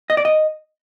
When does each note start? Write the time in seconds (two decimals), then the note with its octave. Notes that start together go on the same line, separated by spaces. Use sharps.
0.10 D#5
0.17 D5
0.25 D#5